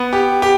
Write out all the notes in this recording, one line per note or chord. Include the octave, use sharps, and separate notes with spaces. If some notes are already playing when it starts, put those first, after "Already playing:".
Already playing: B3
G4
G4